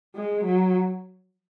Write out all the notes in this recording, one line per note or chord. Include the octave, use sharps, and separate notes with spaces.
G#3
F#3